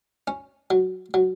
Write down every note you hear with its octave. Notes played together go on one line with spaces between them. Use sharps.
C#4
F#3
F#3